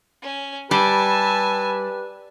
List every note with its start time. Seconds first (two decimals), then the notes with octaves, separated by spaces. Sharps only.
0.22 C#4
0.71 G3 G4 B4 G#5 A5 E6